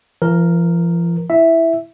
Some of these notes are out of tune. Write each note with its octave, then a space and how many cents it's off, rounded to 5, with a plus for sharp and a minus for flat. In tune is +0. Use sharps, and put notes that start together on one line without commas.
F3 -45 A#4 +0
E4 +0 E5 +0